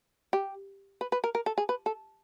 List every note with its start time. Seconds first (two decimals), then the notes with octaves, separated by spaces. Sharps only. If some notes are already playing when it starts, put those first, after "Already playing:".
0.33 G4
1.01 B4
1.12 B4
1.24 A#4
1.35 A#4
1.46 A4
1.58 G#4
1.69 B4
1.86 A4